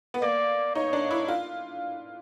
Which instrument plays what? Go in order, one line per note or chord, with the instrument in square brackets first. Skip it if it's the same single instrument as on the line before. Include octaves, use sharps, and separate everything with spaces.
[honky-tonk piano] B3
[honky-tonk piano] A#3 [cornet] D5
[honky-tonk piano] D#4 [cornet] C#5
[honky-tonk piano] D4
E4
F4